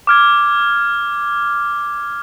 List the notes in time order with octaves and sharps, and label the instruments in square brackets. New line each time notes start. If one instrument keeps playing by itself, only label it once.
[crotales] D6 F6 G#6